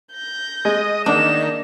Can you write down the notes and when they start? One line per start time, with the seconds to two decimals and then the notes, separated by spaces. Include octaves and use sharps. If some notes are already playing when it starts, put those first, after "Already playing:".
0.13 G6 A#6
0.65 G#3 D#5
1.06 D#3 A#3 D4 E7